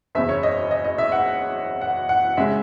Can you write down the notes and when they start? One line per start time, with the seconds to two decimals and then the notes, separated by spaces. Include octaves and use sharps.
0.15 F#1 E2 C#3 E5
0.29 C#5
0.43 D#5
0.71 D#5
0.84 D#5
0.98 E5
1.12 F#5
1.81 F#5
2.09 F#5
2.37 C#3 G#3 E5